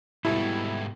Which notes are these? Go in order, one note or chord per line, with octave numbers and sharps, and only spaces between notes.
G#2 B2 G3 E4 G4 A4